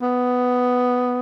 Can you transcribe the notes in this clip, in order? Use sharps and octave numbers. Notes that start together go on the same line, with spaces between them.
B3